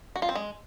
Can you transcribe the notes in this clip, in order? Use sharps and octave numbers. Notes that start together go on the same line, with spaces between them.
F#4
F4
C4
G#3